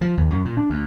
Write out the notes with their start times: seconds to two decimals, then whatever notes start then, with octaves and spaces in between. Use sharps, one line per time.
0.01 F3
0.17 D#2
0.30 F#2
0.45 A#2
0.57 D4
0.70 D2